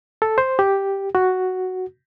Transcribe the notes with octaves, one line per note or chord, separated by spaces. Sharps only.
A4
C5
G4
F#4